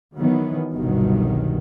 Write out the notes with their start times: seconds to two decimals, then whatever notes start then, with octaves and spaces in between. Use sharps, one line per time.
0.18 D#3 E3 F#3 B3
0.74 G1 C2 G2 B2 D#3 F#3